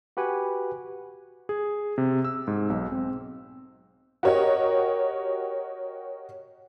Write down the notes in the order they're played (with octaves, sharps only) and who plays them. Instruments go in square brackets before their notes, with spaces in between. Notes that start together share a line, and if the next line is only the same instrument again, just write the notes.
[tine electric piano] F#4 G4 B4 F#5 G#5
[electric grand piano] G#4
C3
E6
G#2
B1
C4
[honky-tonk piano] F#4 G4 A#4 C#5 D#5